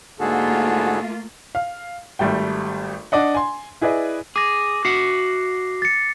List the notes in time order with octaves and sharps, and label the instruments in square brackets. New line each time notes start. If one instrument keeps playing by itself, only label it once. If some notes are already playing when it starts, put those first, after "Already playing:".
[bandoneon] G#2 D3 [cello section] A3 A#3 F4 [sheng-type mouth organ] F#4 G#4 A4
[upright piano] F5
G#1 G3 A3 G5
D4 D5 D#5 F#5
G#5 C6
E4 G#4 B4 D5 D#5
[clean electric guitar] G#4 [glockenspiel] D6 A#6
[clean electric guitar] F#4 E5 F#5 [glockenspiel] C7
[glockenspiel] A6 C#7